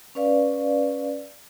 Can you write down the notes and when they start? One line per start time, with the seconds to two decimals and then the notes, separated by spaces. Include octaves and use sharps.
0.15 C#4 B4 D5 F5